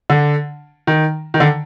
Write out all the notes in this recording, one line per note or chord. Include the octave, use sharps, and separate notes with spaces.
D3
D#3
D#3
D3